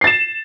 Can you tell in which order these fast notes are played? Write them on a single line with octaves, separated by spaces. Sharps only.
C7 A6 E7